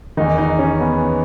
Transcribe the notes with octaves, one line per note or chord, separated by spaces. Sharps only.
E2 D#3 D#4
D#4
C#4
B3